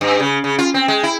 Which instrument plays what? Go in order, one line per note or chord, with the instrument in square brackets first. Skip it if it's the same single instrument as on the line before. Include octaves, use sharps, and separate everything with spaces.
[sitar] G2
C#3
C#3
F4
C4
G#3
E4